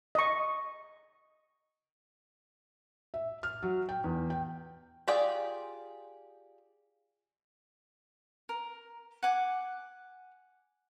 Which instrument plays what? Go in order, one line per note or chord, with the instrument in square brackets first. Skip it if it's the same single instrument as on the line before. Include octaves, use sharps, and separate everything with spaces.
[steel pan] D#5 C#6
[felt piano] E5
F6
F#3
G5
E2
G5
[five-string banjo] F4 G4 G#4 D5 G5
[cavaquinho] A#4
F#5 G#5 D6